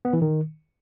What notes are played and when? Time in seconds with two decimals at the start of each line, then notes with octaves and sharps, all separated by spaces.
0.05 B3
0.13 E3
0.22 D#3